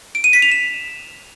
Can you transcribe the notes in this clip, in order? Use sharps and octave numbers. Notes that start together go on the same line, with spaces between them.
D7
D#7
B6
F7
E7